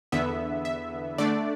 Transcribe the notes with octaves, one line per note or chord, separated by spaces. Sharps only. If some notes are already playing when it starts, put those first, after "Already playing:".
E2 D3 B3 E5
E5
D3 A3 D4 D5